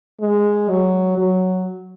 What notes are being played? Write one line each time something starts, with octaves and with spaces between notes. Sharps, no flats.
G#3
F#3
F#3